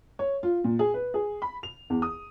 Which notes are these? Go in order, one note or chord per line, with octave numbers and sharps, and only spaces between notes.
C#5
F4
A#2
G#4
B4
G#4
B5
F7
E2
D#6